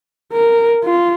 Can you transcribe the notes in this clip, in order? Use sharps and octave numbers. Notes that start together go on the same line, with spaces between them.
A#4
F4